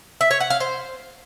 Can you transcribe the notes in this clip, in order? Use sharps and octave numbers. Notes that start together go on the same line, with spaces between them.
E5
C#5
F#5
F5
C5